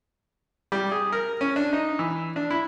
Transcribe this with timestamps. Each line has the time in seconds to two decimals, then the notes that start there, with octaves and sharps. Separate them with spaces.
0.72 G3
0.92 G#4
1.12 A#4
1.41 C#4
1.56 D4
1.73 D#4
1.99 E3
2.36 D4
2.51 E4